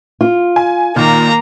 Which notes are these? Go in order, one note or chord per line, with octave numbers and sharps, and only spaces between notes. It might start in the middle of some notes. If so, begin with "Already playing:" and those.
F4
G#5
A#2 D#3 A#3 A#5